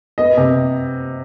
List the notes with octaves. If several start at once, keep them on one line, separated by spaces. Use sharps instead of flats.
B3 D#5
C3